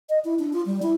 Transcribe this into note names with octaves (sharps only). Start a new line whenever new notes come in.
D#5
E4
D4
F4
G3
E4